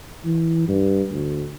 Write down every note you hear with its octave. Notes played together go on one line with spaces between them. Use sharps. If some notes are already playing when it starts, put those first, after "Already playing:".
E3
G2
D2